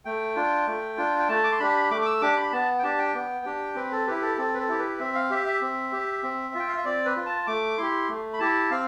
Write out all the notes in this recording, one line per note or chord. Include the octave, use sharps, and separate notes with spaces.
A3 G5
D4 F4
A3
D4 F4
G5
A3 A5
D6
C6
D4 G4 B5
A3 D6
D6
E6
D4 G4 D6
B5
B3 A5
G5
D4 G4 A5
G5
B3
D4 G4
C4 B4
A4
E4 G4 B4
A4
C4 A4
B4
A4
E4 G4
B4
C4 E5
F5
G4 E5
E5
C4
G4
C4
F4
G5
F5
E5
C4 D5
B4
F4
A5
A3 D6
E4 G4 C6
A3
B5
E4 G4 A5
C4 F5